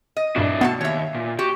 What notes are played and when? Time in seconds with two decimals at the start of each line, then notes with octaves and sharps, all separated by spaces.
0.17 D#5
0.36 G2 A#2 D4 E4 F#4
0.61 B2 A3 B3 F#4 A5
0.81 D#2 C#5 E5
1.14 A#2
1.39 F#4 G4